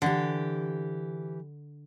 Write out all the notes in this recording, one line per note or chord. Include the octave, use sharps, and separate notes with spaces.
D3 E3 G4